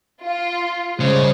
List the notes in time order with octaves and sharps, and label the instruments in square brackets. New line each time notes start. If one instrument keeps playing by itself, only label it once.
[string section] F4
[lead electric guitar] C#3 [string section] G3 G#3 C5